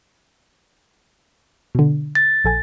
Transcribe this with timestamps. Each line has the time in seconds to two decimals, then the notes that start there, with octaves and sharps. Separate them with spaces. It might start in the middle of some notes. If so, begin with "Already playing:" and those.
1.75 B2 D3
2.15 A6
2.44 A#1 A4 G#5